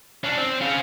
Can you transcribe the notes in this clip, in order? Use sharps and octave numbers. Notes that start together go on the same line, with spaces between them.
C#4 D4
C4
C#4 F5